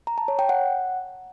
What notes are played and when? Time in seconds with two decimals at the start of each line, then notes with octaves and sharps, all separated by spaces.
0.07 A#5
0.18 A5
0.28 C#5
0.39 G5
0.49 F#5